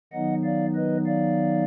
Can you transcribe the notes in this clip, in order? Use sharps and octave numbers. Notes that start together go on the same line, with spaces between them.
D#3 F#3 B3 D#4 D#5 F#5
D5 F5
B4 D#5
D5 F5